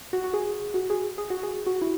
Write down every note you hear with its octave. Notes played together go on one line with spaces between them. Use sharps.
F#4
F#4
G#4
F#4
G#4
G#4
F#4
G#4
F#4
E4